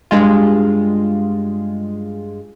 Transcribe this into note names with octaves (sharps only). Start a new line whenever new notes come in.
G2 G#3 F4